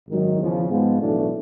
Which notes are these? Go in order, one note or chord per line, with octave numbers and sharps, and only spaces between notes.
G#1 F#2 D#3 F#3
E2 C#3 F3
G#2 F3 G#3 B3
B1 A2 E3 A3 D4